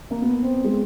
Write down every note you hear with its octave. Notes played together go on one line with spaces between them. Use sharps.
A#3
B3
C4
G#3